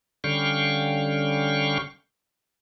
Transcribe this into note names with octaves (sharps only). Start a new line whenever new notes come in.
D3 G3 C#4 F5 G5 C#6